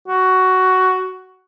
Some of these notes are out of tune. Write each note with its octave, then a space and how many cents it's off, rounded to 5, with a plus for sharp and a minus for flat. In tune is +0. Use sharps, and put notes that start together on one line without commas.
F#4 +10